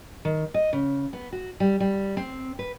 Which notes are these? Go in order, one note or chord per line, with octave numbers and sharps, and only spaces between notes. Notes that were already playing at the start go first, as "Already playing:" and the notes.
D#3
D#5
C#3
B3
F#4
G3
G3
C4
B4